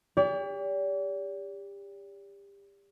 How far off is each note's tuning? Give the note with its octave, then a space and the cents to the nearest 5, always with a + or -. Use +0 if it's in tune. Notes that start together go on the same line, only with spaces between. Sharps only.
G4 +30 D5 -40